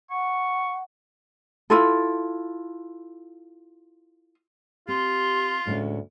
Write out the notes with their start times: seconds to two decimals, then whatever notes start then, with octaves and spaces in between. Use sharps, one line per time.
0.11 F#5 C#6
1.70 E4 F4 A4
4.88 C4 F4 G4 C6
5.67 D2 A2 G#3 C#4